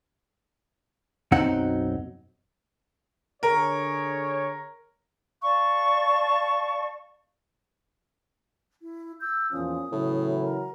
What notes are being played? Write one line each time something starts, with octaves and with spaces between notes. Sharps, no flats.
B1 F#2 F#3 C4 D#4 F#5
D3 G#4 A#4 C#5
D5 F5 A5 C#6
E4
E6 G6
E2 A#2 F3 C#4 D#6
A2 C#3 E3 F#3 E4
A#4 A#5